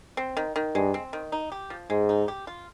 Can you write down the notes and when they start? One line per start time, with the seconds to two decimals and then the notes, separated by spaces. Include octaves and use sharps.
0.17 C4
0.37 D#3
0.56 D#3
0.75 G2 G#3
0.94 C4
1.13 D#3
1.32 D#4
1.52 G4
1.70 F3
1.90 G#2 G#3
2.09 D#4
2.28 G4
2.47 F4